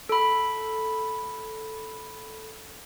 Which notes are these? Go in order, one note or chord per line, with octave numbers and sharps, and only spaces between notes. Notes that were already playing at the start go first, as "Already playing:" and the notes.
A4 B5